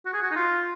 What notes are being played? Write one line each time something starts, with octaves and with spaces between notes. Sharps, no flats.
F#4
G#4
F#4
D#4
F4